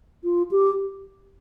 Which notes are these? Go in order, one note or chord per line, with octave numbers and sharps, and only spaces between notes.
F4
G4